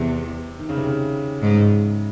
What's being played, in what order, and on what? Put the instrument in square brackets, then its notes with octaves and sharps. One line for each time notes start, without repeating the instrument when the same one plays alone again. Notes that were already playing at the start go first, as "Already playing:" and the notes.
Already playing: [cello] E2 [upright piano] C3
[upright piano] D#3
C#3
C3
C#3
[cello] G#2